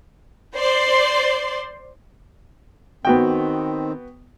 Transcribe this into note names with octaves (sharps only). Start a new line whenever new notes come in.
C5 D5 C6
D#3 B3 C4 F#4 G5